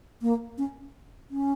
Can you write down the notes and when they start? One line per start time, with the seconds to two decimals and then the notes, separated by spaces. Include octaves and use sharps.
0.22 A#3
0.58 C#4
1.31 C#4